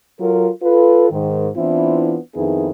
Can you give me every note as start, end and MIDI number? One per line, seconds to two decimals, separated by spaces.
0.19 0.49 54
0.19 0.49 65
0.19 0.49 69
0.19 0.49 70
0.62 1.10 65
0.62 1.10 69
0.62 1.10 71
1.11 1.48 44
1.11 1.48 51
1.55 2.16 52
1.55 2.16 59
1.55 2.16 60
1.55 2.16 62
1.55 2.16 64
1.55 2.16 65
2.35 2.70 41
2.35 2.70 51
2.35 2.70 59
2.35 2.70 63
2.35 2.70 64
2.35 2.70 68